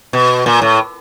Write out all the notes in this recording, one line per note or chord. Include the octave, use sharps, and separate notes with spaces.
B2
A#2
A2